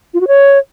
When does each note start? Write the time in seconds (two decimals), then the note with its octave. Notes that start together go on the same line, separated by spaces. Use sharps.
0.14 F4
0.21 F#4
0.28 C#5